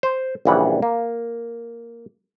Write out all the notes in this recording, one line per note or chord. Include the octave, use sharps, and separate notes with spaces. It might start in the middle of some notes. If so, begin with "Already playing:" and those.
C5
A#1 C#3 E3 G3 F#5
A#3